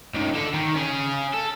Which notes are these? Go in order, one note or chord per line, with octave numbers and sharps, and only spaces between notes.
C#2 D#3
D3 A4
D#3
C#4 G#4
A4